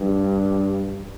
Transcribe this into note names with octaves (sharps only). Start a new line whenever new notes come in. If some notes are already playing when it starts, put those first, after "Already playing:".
Already playing: G2